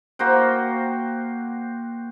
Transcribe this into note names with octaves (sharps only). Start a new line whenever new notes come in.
A#3 F#4 C5 G5